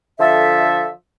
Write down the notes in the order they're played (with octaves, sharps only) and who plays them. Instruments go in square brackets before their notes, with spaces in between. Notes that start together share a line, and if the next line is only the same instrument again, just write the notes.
[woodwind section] D3 F3 A4 E5